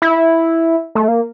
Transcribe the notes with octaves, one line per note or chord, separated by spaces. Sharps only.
E4
A3
A#3